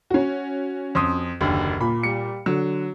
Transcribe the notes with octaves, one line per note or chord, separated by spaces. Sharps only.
C#4 F#4
F2 C6 D#6
F#1 D#2 D3
A#2 B5
G3 C#7
D3 F#3